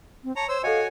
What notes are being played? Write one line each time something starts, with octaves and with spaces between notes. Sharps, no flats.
C4
C#5 A5 A#5
C5 C#5 E6
F#4 A4 C#5 D#5 F5 G#5